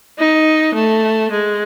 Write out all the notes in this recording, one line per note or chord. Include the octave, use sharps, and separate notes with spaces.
D#4
A3
G#3